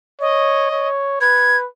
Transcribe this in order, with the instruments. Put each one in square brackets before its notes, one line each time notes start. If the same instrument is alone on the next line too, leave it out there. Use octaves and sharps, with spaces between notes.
[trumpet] C#5 [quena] D#5
[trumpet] C#5
[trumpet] B4 [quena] G#6